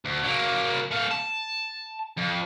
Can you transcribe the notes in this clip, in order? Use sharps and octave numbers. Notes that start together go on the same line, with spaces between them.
D2
F#3 A#3
A3 F5
A5
F2